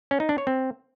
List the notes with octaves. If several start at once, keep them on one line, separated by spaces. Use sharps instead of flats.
C#4
D#4
D4
C#5
C4